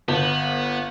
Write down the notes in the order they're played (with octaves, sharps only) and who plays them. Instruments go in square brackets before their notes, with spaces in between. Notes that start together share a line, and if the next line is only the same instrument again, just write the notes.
[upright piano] G1 [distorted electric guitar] B3